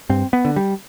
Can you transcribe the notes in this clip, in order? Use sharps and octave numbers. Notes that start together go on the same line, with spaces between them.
G2 C4
B3
D3
G3